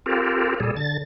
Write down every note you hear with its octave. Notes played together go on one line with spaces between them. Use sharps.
C4 F4 G4 A4 A#4
A#2 G3 G#4 A4
D3 A6